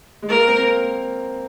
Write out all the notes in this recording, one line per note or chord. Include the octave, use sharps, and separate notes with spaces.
G#3
A#3 A#4
C4
A#3